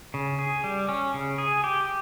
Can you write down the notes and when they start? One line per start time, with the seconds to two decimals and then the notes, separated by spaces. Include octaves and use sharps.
0.14 C#3
0.39 G#4
0.64 G3
0.89 C#4
1.14 C#3
1.38 G#4
1.64 G4